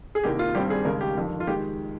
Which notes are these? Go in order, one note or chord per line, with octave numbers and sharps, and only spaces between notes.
G#4
C2 C3 D#3 A#3 G4
F4
G#1 G2 G3 C4 G4
G#4
D#2 C#3 G#3 A#4
G4
G1 F2 D#3
F4
D#3 G#3 G4